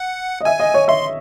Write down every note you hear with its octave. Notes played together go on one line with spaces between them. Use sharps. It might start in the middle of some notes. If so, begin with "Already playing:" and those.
Already playing: F#5
D#5
E5 G#5
D#5
C#5
E5 C6